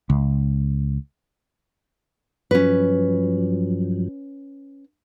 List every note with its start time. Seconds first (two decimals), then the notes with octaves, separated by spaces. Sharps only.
0.10 C#2
2.51 G2 F3 F#3 C#4 B4